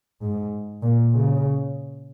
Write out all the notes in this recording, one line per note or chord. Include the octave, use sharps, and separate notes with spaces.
G#2
A#2
C#3